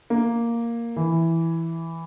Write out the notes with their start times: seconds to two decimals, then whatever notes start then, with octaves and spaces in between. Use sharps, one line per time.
0.10 A#3
0.96 E3